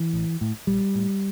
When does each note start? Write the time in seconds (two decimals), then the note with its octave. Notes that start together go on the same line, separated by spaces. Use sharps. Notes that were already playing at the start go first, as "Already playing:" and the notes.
Already playing: E3
0.13 A1
0.41 A2
0.67 A#1 G3
0.95 A2